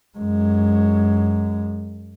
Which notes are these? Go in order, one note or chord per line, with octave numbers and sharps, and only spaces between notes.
F#2 G#3